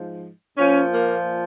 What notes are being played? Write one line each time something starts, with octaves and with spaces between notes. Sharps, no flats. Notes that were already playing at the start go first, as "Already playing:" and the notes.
Already playing: G#2 F3
A#2 F3 C#4
A#3